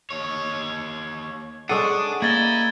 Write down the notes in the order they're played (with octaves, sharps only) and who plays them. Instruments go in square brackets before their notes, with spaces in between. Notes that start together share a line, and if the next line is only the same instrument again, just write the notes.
[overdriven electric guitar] D#2 C#5
[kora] G#3 C#4 A4 [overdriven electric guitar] D4 [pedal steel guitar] F#5 D#6 [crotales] D#7
[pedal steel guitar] A#3 D#5 [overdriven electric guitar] E4 [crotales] G#6 A6 G7